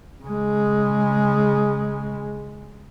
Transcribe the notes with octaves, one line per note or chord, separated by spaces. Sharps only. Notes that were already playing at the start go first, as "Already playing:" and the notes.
C#3 G#3